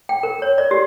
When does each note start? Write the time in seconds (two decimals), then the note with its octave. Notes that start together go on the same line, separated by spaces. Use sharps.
0.09 G5
0.23 A#4
0.42 C#5
0.58 D5
0.71 G4